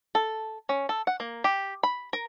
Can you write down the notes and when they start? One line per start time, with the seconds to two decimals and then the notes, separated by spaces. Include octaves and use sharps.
0.15 A4
0.69 C#4
0.89 A4
1.07 F#5
1.20 A#3
1.44 G4
1.83 B5
2.13 A#4